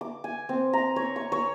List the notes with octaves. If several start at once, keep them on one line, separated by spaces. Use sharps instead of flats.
D6
G#5
C4
A#5
C#5
C#6
C#5